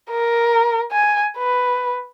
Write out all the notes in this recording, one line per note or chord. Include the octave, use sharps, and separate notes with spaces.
A#4
G#5
B4